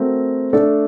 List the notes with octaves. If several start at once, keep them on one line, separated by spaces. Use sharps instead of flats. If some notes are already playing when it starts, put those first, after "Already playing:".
Already playing: A3 C4 F#4 A#4
A3 D4 A4